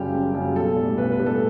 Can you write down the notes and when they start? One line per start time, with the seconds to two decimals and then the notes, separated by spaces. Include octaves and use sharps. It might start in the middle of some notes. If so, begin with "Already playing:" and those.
Already playing: F#2 C#3 G3 G4
0.13 F#1
0.34 F#2 C#3 G3
0.56 B1 A4
0.77 A2 G3
0.98 B1 B4
1.12 B4
1.19 A2 G3
1.26 A4